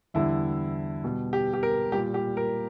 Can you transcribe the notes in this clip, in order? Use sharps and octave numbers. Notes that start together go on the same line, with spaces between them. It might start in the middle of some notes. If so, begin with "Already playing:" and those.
E2 D3 G3 E4
B2 G3
G4
G4
A#4
A#2 G3 G4
G4
A#4